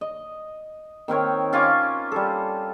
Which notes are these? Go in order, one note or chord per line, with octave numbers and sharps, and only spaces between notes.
D#5
D#3 C4 A#4 C#5
C#4 F4 G#5 D6
G3 A4